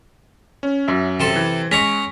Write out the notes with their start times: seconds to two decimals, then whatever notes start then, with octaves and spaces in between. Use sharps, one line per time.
0.63 C#4
0.88 F#2 E5
1.20 C3 A4 C6
1.36 E3
1.72 G#3 C#4 A#5 C#6 A#6 B6